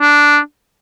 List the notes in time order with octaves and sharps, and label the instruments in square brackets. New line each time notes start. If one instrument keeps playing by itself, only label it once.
[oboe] D4